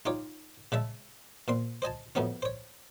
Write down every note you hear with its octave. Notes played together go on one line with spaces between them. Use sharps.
D#4 F4 G4 C#5
C#3 G#3 E5 A5
A#2 C4 C6
C5 D#5 G#5 A5
F2 A2 F#3 B3 C#4
C5 C#5